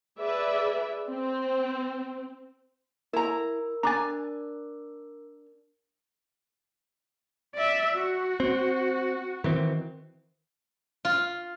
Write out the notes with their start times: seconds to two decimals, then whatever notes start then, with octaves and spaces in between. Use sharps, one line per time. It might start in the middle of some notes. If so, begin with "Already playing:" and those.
0.18 G#4 B4 D5 E5
1.09 C4
3.13 E4 A#4 A#5
3.83 D4 G#5 A#5 D6 A6
7.55 D5 E5
7.95 F#4
8.40 C4
9.44 D#3 E3 C4
11.05 F4